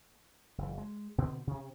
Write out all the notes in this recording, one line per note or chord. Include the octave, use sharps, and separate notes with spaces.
F#1 E3
G#3
B2 D3 B3 C4
C3 C#4